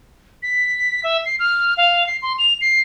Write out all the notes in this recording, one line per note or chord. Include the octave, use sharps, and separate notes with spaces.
B6
E5
C7
F6
F5
C7
C6
F7
C7